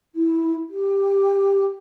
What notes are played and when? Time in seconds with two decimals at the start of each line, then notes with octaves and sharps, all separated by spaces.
0.15 E4
0.69 G4